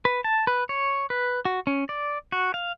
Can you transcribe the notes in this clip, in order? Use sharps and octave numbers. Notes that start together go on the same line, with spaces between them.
B4
A5
B4
C#5
B4
F#4
C#4
D5
F#4
F5